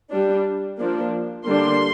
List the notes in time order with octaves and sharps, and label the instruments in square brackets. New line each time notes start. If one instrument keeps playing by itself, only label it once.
[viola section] G3 D4
F3 A#3 D4
D3 G3 A#3 D4 C6